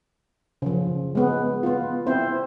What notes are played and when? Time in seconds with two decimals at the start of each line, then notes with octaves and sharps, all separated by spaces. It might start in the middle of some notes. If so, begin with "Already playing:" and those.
0.62 C#3 F3
1.15 G#3 B3
1.63 B3 F4
2.06 C4 E4 C5